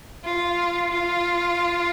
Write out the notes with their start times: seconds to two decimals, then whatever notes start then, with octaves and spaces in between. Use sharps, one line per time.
0.24 F4
0.92 F4